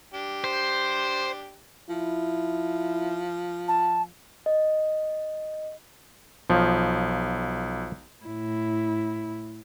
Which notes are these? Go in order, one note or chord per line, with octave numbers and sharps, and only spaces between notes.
D4 G4
C5
F3 E4
A5
D#5
B1 F3 C#5
A2 E4